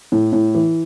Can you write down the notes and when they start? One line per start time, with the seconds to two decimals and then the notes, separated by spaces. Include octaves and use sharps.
0.12 A2
0.33 A2
0.55 E3